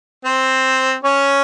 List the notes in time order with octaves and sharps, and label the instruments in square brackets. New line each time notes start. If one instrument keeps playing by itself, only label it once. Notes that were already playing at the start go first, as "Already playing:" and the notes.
[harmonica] C4 C5
C#4 C#5